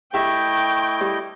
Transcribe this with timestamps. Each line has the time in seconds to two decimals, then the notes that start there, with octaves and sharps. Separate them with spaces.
0.14 A3 E4 G4 D#5 E5 G5 C#6
1.01 G3